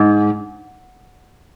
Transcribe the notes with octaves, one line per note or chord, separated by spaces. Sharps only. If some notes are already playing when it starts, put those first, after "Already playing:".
Already playing: G#2